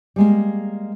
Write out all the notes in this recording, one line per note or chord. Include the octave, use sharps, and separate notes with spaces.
G3 G#3 A#3